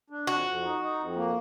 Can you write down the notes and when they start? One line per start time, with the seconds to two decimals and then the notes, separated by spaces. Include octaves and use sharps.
0.10 D4
0.27 F2 F#4
0.46 F2
0.64 D#4
0.81 D#4
0.99 F2
1.16 A#3